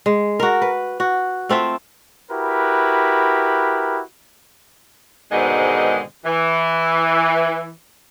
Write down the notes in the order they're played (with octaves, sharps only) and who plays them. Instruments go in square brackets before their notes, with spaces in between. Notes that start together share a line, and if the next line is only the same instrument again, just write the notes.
[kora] G#3
F#4 A#4
B4
F#4
A3 C4 F4 E5
[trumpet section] E4 F#4 G4 A#4 B4
[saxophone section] G#2 B2 D3 D#3 G#3 C4
E3